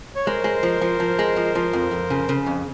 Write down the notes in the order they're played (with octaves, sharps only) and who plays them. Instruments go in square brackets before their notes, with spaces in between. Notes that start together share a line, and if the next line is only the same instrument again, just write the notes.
[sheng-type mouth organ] C#5
[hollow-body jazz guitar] G#3 [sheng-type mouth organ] A#4 C5
[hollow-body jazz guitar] G#3
F3
F3
F3
G#3
F3
F3
F2
F2
C#3
C#3
F2